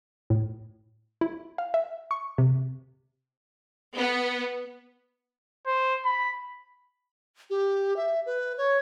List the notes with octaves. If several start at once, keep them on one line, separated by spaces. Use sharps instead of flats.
A2
E4
F5
E5
C#6
C3
B3
C5
B5
G4
E5
B4
C#5